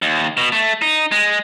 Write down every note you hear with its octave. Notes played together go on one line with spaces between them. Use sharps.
D#2
B2
A3
D#4
G#3